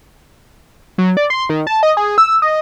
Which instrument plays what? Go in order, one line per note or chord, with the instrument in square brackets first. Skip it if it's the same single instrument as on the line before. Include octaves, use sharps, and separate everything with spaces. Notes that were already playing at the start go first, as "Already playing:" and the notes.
[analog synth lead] F#3
D5
C6
D#3
A5
D#5
G#4
E6
D#5